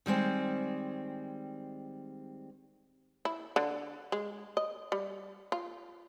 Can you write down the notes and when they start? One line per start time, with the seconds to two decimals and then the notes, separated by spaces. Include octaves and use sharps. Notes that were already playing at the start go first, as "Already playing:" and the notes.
0.06 D#3 G3 G#3 C4
3.25 E4
3.56 D3
4.12 G#3
4.57 D#5
4.92 G3
5.52 F4